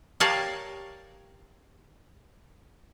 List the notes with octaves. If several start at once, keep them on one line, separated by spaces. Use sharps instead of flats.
G4 A#4 C#5 D5 F5 A5